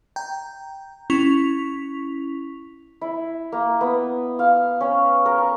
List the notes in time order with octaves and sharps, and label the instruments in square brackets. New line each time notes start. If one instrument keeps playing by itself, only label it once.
[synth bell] G5 A#5 G6
C#4 E4 C#6 B6 F7
[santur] E4
A#3
B3
F5
C#4
A#4
C#6